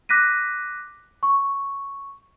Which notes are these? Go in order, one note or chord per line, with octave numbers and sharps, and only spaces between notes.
D6 F#6 A#6 B6 D#7
C#6